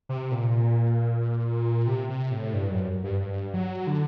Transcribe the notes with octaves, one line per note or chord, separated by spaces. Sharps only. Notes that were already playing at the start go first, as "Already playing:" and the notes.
C3
A#2
C3
C3
A2
G2
F#2
G2
G2
F#3
D3